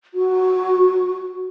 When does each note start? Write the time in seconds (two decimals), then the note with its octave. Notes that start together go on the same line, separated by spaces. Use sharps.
0.14 F#4